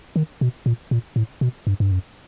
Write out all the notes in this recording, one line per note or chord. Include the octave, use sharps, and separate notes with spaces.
D#3
B2
A#2
A#2
A2
B2
G2
G2
F#2